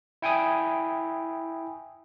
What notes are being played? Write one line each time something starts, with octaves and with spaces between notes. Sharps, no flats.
E4 G5 G#5 D#6